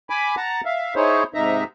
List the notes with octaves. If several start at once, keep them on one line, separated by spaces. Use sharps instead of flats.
G#5 B5 D6
F#5 A5 A#5
E5 F5
D#4 E4 G#4 C5 C#5
G#2 C3 D#4 E5 A#5